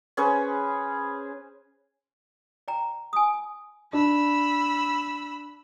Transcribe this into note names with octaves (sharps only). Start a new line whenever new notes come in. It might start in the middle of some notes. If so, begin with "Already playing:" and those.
C#4 G#4 B4 C5
D5 G5 A#5
G#5 D#6
D4 B5 E6